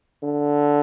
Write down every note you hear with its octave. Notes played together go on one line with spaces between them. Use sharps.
D3